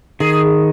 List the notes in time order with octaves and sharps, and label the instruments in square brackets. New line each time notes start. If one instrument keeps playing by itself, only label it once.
[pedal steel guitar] D#3 [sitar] G#4